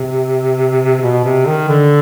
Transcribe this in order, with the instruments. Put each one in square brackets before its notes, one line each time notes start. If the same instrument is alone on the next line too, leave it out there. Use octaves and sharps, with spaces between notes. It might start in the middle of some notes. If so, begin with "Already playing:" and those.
Already playing: [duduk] C3
B2
C3
D#3
D3